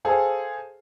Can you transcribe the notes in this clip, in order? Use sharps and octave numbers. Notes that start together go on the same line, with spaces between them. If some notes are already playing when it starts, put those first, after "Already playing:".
G#4 A4 C5 F5 G5